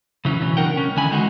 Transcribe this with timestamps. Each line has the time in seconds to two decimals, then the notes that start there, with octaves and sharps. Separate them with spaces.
0.25 C#3 E3 F#3 C#4
0.42 B2 E3 F#3
0.57 D4 A#4 F#5 G5
0.77 C#2 C#4
0.96 D2 D3 D#3 G#5 B5
1.11 D#3 E3 G#3 D#4 F#4